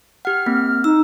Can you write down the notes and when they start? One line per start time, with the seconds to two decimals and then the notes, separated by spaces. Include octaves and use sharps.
0.25 G4 F#5 F6
0.46 A#3 C4
0.84 D#4 E6